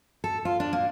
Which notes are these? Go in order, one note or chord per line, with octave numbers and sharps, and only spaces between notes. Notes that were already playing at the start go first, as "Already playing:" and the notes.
A4
F4
D4
A#3